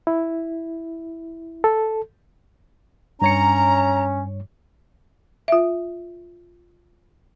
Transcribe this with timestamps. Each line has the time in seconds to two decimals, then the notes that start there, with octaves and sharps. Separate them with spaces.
0.07 E4
1.64 A4
3.22 G2 C#4 C#5 A#5 C#7
5.48 F4 E5